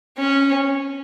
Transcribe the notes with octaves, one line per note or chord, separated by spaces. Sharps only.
C#4